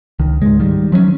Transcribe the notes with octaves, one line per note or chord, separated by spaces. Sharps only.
C#2 D#3
G#2 G#3
D#3 G3
F3 F#3 A3 C#4